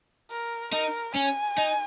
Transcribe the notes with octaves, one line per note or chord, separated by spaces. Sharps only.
A#4
D#4 A#4
C#4 G#5
D#4